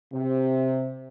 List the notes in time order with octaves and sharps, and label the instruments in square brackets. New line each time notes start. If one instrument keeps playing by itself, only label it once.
[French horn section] C3